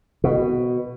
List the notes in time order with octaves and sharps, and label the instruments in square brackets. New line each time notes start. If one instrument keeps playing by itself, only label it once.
[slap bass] B2